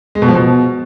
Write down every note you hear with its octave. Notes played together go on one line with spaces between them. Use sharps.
G#3
B2
F3
B2